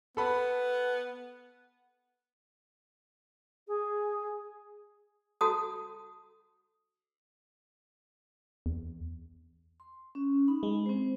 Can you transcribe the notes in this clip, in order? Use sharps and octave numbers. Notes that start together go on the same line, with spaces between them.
B3 A4 B5
G#4
F#4 A4 A5 D#6
E2
C6
C#4
D#4 B5
G#3
C4 C5